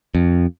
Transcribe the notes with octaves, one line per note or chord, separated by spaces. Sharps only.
F2